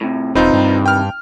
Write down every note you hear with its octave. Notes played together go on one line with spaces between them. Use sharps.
A2 C3
E1 C3 D#3 C4 D#4 F4 B4
G2
G5 F6